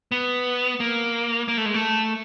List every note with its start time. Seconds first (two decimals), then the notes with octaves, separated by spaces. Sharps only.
0.12 B3
0.80 A#3
1.48 A#3
1.58 A3
1.66 G#3
1.74 A3